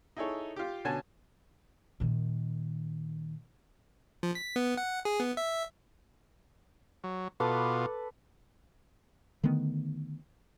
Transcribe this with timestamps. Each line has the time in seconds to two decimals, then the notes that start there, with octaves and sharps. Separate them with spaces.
0.17 D#4 E4 G#4 A4 C#5
0.56 F4 G4
0.85 B2 D3 C#4 G#5 A5
2.00 A#2 D#3
4.23 F3
4.35 B6
4.56 B3
4.77 F#5
5.05 G#4
5.20 B3
5.37 E5
7.04 F#3
7.40 B2 F4 A4 B4 D6
9.43 D3 D#3 A3 B3